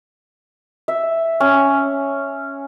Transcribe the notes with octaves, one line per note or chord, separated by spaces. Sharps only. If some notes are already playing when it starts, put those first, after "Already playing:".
E5
C#4